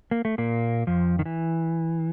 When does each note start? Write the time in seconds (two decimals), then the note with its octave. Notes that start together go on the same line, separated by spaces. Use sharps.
0.11 A#3
0.25 A3
0.38 A#2 A#3
0.87 F2 F3
1.19 D#3
1.26 E3